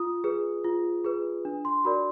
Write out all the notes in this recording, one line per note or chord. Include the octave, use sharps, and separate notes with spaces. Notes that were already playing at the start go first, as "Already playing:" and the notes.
Already playing: F4 D#6
G#4 B4
F4
G#4 B4
D4
C6
F#4 A#4 D5 B5